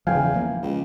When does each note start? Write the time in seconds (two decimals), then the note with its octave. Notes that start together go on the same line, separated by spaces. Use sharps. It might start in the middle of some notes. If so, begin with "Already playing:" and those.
0.07 E2 C#3 F3 F5 G5 G#5
0.34 F3 A#3
0.62 C#2